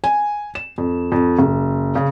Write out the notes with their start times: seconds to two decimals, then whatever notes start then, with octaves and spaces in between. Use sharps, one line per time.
0.04 G#5
0.55 E7
0.78 F2
1.12 F2
1.39 F#1
1.95 C#3